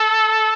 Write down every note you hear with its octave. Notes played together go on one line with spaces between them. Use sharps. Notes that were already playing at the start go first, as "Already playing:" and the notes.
Already playing: A4